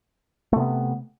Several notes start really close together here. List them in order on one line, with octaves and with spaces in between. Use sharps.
A3 C3 B3